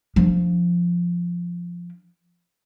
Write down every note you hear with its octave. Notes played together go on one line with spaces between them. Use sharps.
F3 D4